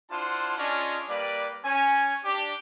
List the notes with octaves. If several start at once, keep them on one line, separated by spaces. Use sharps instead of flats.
D4 E4 F4 C5 F#5 A5
C#4 D4 F4 G#4 C#5 D#5
G3 A#3 G4 B4 D5
C#4 G#5
D4 G4